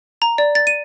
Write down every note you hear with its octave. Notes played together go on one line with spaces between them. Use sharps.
A#5
D5
A6
D#7